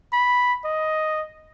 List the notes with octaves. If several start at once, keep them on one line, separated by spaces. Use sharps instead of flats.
B5
D#5